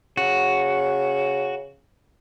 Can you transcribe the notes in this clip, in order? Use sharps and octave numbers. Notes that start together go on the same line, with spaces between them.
C#3 F#4